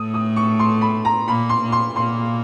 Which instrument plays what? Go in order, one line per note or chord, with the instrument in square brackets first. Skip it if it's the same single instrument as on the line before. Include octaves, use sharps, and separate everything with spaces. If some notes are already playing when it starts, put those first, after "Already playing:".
Already playing: [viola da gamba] A2 A3 [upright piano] D#6
[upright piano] D#6
C#6
C6
B5
A#5
[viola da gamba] A#2 A#3 [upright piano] B5
[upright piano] C6
[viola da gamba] A#2 A#3
[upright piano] C6
[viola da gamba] A#2 A#3 [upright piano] C6